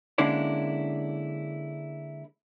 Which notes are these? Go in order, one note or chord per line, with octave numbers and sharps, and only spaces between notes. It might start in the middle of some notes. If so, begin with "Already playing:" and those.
D3 G#3 A#3 C#4 D4 E4